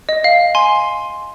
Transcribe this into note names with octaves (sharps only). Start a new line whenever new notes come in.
D#5
F5
G#5 C6